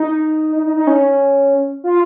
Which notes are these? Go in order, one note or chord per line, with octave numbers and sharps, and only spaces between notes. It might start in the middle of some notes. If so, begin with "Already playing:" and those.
Already playing: D#4
D#4
D#4
D#4
C#4
F4